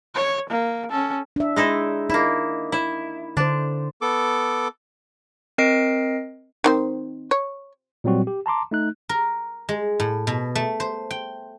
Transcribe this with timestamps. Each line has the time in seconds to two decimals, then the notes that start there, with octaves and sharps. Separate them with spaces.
0.15 C#5
0.50 A#3
0.91 C#4 A4
1.36 D4 E5
1.56 G#3 D#4 E4
2.10 A#3 D#4 E4
2.72 E4
3.37 D3 D4 C5
4.02 B3 A4 D6
5.58 C4 A#4 D#5 C7 D7
6.64 D#3 C4 C5
7.31 C#5
8.04 A#2 F#3 G3 C4 F#4
8.27 G4
8.46 A5 A#5 C6 D6
8.71 A3 D#4 F#6
9.09 A#4
9.69 G#3
10.00 A2
10.27 B2
10.55 A3
10.80 C5
11.11 G5